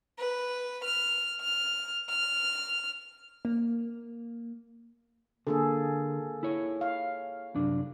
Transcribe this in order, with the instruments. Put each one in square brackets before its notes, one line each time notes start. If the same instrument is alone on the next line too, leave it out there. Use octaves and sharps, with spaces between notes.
[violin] B4
F6
F6
F6
[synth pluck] A#3
[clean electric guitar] D3 [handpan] A#3 G#4 A4
[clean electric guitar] E4 C#5
[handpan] F5
[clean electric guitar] C2 F#2 D4